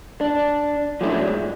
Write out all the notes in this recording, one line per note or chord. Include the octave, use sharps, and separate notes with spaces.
D4
F3 F#3 A3 C#4 D4 E4
G#2